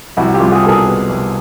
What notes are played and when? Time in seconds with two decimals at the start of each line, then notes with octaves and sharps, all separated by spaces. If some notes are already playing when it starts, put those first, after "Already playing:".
0.17 C2 E4 F#4
0.34 F4 G4
0.40 C2
0.51 F#4 G#4
0.63 B2 A4
0.68 G#4 A#4
0.86 B2
1.09 C2